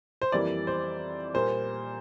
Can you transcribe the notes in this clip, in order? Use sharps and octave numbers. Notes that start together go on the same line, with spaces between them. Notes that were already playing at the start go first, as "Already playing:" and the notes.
C5
F2 E3 G3 A#3 D5
C5
A#2 G3 A#3 C5